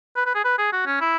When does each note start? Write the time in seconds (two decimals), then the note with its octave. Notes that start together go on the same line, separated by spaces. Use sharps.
0.16 B4
0.26 B4
0.35 G#4
0.45 B4
0.58 G#4
0.72 F#4
0.86 C#4
1.01 E4